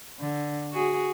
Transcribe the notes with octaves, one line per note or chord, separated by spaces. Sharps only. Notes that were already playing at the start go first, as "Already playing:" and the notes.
D3
F#4 G#4